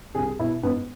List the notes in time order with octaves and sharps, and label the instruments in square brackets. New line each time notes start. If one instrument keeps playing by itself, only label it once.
[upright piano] C2 G#4
B2 E4
G#2 B3